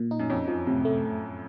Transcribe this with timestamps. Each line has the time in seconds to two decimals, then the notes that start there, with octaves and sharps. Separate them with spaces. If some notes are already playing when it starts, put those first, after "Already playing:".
Already playing: A#2
0.11 D#4
0.20 F#2
0.30 F2 C#4
0.48 F#2 F3
0.66 A2 C3
0.85 A3